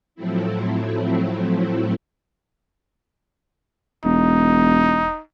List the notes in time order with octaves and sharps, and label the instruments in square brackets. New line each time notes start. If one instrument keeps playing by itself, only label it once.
[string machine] A2 F3 F#3 A3 C4 E4
[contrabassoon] E1 [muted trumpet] D#4